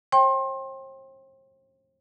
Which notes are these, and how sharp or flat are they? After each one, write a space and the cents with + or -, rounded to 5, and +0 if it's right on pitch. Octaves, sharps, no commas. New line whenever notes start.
C5 +45 G5 +0 C6 +30